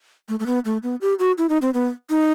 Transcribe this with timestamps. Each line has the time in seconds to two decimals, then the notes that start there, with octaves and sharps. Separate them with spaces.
0.29 A3
0.40 A3
0.46 B3
0.65 A3
0.83 B3
1.01 G4
1.19 F#4
1.38 E4
1.49 D#4
1.62 C4
1.74 B3
2.10 D#4